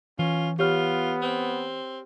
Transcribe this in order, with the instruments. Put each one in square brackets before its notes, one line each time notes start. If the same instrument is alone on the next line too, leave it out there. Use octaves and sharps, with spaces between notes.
[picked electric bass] E3 [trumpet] C#4 [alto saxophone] F4
[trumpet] B3 [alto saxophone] F4 [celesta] G4 C#5 F6
[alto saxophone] C4